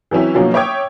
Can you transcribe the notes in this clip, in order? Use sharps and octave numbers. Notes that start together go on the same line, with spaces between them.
E3 F#3 C4 C#4 E4
B2 D3 F3 F#3 A#3 C#4
C#5 E5 G5 D6 D#6 G#6